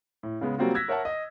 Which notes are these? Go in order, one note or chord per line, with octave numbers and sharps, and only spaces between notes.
A2
C#3 G#3 B3
F#3 G3 A#3 C4 F4 F#4
E6 F#6 G#6 A#6 B6
A#4 C#5 E5 F#5 A5
D#5